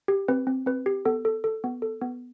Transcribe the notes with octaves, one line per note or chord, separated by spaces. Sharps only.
G4
C4 B4
C4
C4 B4
G4
B3 A4
A4
A4
B3
A4
B3